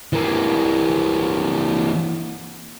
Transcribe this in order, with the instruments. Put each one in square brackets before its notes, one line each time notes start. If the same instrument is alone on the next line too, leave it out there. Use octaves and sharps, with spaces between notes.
[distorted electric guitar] E3 A#3